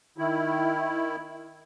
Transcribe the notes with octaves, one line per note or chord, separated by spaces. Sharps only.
D#3 E4